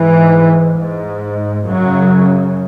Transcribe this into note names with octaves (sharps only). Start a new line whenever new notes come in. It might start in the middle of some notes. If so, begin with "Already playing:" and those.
Already playing: G#2 E3
G#2
F#2 C#3 F#3